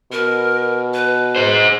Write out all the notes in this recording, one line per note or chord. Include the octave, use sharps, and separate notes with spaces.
B2 A#4
B4
G#4 C5